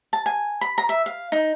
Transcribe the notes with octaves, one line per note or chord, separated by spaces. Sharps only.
A5
G#5
B5
A#5
E5
F5
D#4